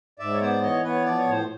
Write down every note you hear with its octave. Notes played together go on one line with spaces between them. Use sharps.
G#2 D5 E5
C#5
B3 C5 D5
E3 C#5 D#5
B3 B4 C#5
F3 D5
C#5
A2 C5